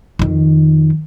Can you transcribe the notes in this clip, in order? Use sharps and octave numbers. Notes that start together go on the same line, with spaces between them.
F2 D#3